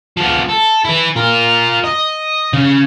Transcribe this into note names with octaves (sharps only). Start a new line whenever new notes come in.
F3 B3
A4
E4 B4
F4 A#4
D#5
C#3